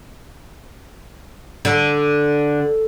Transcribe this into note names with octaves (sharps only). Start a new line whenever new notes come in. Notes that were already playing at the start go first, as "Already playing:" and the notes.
D3